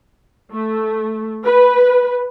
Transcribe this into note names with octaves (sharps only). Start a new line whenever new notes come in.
A3
B4